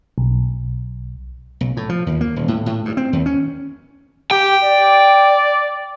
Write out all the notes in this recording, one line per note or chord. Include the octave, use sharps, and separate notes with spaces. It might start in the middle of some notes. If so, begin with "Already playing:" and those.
B1
B1
A2
F3
D#2
A#3
D#1
A2
A2
G2
C4
D#2
C#4
G4 G5
D5